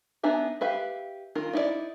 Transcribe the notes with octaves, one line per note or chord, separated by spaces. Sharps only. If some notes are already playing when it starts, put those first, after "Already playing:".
B3 D4 D#4 E5 G#5
G4 B4 E5 F5
D#3 F4 A#4
D#4 E4 F#4 D5